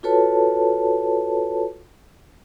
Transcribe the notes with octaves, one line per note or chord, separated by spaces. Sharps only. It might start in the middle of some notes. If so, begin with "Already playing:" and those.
F4 F#4 A4 B4 C#5 A5